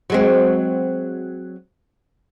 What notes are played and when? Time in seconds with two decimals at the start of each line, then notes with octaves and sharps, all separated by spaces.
0.10 F#3 G#3 C4